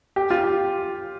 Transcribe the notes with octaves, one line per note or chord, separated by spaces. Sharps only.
G4
F4
G4